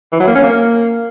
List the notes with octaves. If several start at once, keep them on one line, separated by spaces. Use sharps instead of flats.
E3
F#3
A#3
C#4
A#3